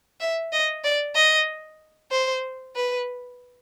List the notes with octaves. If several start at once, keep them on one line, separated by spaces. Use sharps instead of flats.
E5
D#5
D5
D#5
C5
B4